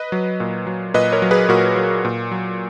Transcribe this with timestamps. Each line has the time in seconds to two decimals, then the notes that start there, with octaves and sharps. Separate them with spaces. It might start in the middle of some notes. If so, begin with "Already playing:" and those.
Already playing: B4 D#5
0.12 F#3
0.40 A#2
0.67 F#3
0.94 A#2 B4 D#5
1.12 A#4 C#5
1.22 F#3
1.31 G#4 B4
1.49 A#2 F#4 A#4
1.76 F#3
2.05 A#2
2.31 F#3